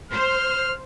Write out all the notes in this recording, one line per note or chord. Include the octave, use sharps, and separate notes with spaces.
C5 F6